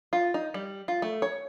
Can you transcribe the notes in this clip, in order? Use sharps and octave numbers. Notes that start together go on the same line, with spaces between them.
F4
D#4
G3
F4
A3
C#5